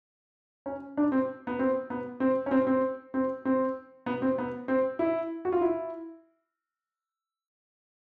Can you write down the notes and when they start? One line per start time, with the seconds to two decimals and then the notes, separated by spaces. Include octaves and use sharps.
0.66 C#4
0.97 D4
1.12 C4
1.47 B3
1.59 C4
1.90 B3
2.20 C4
2.46 C#4
2.51 C4
2.67 C4
3.14 C4
3.45 C4
4.06 B3
4.22 C4
4.38 B3
4.68 C4
4.99 E4
5.45 F#4
5.52 F4
5.61 E4